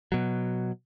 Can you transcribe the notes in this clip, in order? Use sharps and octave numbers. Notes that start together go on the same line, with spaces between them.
B2 F#3